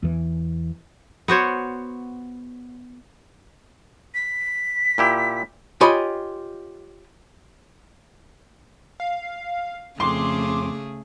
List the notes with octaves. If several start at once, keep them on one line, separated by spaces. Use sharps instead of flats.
E2 E3
B3 F#4 C5 C#5
B6
A#2 E4 G4
F4 G4 C#5 D#5 G#5 B5
F5
C2 F2 C#3 A3 G#4 C6 D6